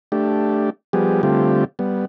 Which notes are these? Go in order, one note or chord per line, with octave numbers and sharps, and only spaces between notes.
A3 D4 G4
F3 G3 B3 G4 G#4
D3 G3 A3 C4 F4 G4
G3 B3